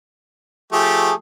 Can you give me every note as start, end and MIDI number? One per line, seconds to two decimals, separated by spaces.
0.72 1.12 53
0.72 1.12 57
0.72 1.12 67
0.72 1.15 68